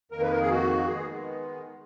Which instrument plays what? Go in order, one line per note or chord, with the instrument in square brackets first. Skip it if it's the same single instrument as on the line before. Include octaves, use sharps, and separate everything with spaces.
[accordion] F2 D#3 A#3 A#4
B4
A#4
G#4
F#4
D#3 G#3 B3 G#4